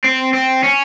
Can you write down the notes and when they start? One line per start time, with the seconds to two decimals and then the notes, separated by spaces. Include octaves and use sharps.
0.04 C4
0.34 C4
0.63 C#4